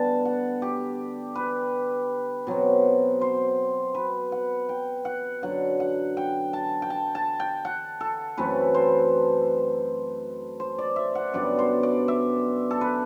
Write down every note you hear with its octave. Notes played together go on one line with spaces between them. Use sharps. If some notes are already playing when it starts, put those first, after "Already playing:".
Already playing: D3 G3 B3 D4 A5
F#5
G4
B4
B2 F#3 C4
C5
B4
F#5
G5
F#5
F#2 D3 F#3 F#5
F#5
G5
A5
G5
A5
A5
G5
F#5
A4
F#2 E3 A3 C4 B4
C5
C5
D5
E5
F#5
F#2 D3 G3 B3 D5
C5
D5
E5
A4
B4